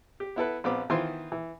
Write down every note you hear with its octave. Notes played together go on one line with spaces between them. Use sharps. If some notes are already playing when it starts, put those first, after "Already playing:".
G4
B3 E4 A4 B4
A#1 B3 C4 B5 D6
D#3 E3 B3 F4 C5 C6
E3